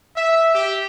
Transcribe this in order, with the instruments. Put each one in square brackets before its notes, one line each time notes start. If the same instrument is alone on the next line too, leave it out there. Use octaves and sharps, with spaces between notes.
[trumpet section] E5
G4